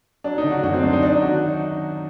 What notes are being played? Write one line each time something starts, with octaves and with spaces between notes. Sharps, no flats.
F#3 D4
D#4
D3
F#4
F#2 F#4
C4
F#2 D4
D#4
F#3 D4
D#4
D#3 F#4